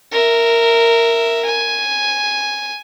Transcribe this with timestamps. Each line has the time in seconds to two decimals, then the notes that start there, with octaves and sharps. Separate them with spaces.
0.12 A#4 E5
1.45 G#5